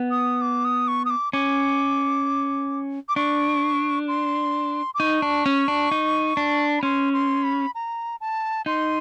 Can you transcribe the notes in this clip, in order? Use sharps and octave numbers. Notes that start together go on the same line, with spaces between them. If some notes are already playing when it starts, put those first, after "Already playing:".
Already playing: B3
D#6
D6
D#6
C#6
D#6
D6
C#4 D6
D6
D4 C#6
C6
D6
D#4 C#6
D4
C#4
D4
D#4
D4
B5
C#4 C6
C6
B5
A#5
A5
D#4 C6